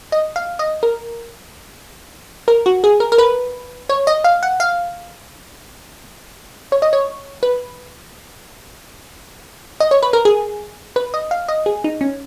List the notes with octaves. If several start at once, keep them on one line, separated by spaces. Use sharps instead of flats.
D#5
F5
D#5
A#4
A#4
F#4
G#4
A#4
A#4
B4
C#5
D#5
F5
F#5
F5
C#5
D#5
C#5
B4
D#5
C#5
B4
A#4
G#4
B4
D#5
F5
D#5
G#4
D#4
C#4